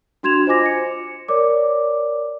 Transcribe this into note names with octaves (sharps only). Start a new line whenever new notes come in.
D4 F#4 C6 G#6 E7 F7
F4 C5 D#5 G#5 D6 A#6
C#7
A#4 C#5 D5 D6